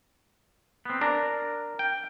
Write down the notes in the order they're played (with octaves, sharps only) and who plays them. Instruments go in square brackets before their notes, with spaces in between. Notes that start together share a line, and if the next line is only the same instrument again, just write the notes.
[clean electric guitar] B3 C4
[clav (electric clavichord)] D4 [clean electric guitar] A#4 A#5
[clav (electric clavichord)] G5